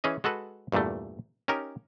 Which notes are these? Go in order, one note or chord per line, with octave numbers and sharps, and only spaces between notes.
E3 C#4 G#4 D#5
G#3 F#4 A4 B4
E2 G2 A#2 G3 A3
C#4 D#4 G4 A#4